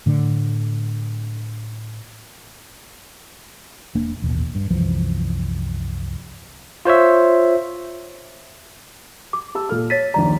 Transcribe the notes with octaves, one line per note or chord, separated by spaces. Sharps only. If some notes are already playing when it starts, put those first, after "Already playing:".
A2 D3
E1 A#3 D4
A1 D#2 B2
G2
C2 F#2 E3 F3
F4 C5 C#5 E5
D6
G4 A5 E6
A#2 A4 F6
C#5 A6 B6 D#7
A#1 D#2 D5 A#5